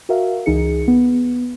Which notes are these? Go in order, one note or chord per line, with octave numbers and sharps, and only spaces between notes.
F#4 A#4 E5 F5
C#2 E3 D#4 G#4 C#7
B3